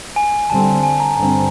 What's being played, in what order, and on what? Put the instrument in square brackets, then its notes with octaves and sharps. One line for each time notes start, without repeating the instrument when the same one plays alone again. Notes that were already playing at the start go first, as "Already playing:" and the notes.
[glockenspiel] G#5
[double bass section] D3 G3 C4 [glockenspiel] A5
[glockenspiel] G#5
A#5
[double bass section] G2 D3 G3 C4 [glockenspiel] A#5